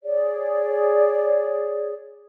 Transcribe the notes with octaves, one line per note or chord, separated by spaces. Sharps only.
G#4 C#5 D5